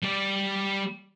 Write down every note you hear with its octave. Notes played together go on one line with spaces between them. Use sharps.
G3 D5